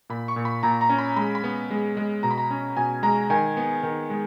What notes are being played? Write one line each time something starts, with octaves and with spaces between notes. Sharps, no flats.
A#2 B5
C#6
A#2
B5
A#2 A#5
A#5
C#4
B5
G#3 B5
B5
B3
G#3
G#3
B2 A#5
B5
A#5
C#4
B2 G#5
G#3 A#5
D#3 G#5
B3
D#3
G#3